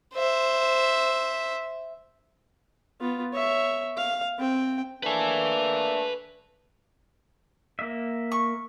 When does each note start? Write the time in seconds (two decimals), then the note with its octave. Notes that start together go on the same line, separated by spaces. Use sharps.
0.14 C5 E5
3.00 B3 F4
3.33 C#5 E5
3.97 F5
4.39 C4 G5
5.03 A3 A#3 D4 B4 G#5
7.79 A#3 E5
8.32 C#6